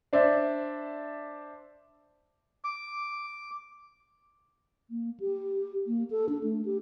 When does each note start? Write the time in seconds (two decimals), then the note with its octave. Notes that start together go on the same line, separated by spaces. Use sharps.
0.13 D4 C5 D5 E5
2.64 D6
4.90 A#3
5.20 G4
5.87 A#3
6.11 A4
6.29 D4
6.44 A3
6.65 G4